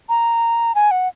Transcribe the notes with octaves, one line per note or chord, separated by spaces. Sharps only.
A#5
G#5
F#5